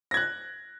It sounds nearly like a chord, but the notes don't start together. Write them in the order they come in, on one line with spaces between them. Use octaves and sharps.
A#6 G#6 F#6